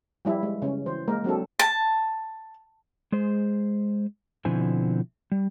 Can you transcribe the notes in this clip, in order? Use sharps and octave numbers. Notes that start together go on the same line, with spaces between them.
F3 G3 E4
G#3
C#3 C#4
E3 C5
G#3 A#3 A#4
F#3 C4 D4 A4
A5
G#3 G#4 C5
B2 D3 F3 C4 E4 G#5
G3